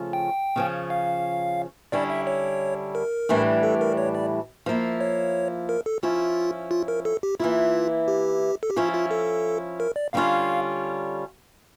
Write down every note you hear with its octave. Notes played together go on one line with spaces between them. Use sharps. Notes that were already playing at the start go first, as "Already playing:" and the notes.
Already playing: C#3 F3 A3 C#4 F4
G5
C#3 F3 C#4
F5
D3 G3 C#4 E4 D5
E5
C#5
A#4
A2 E3 G3 D4
A4
A#4
C#5
D5
F3 A#3 E4
C#5
A#4
A4
F3 C#4 E4 F4
F4
A#4
A4
G4
E3 A#3 E4 F4
G4
A4
G4
F3 C#4 E4 F4
F4
A4
A#4
D5
D3 G3 C#4 F4 F5